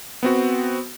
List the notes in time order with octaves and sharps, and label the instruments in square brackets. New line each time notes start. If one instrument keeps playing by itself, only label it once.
[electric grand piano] B3 C4 F#4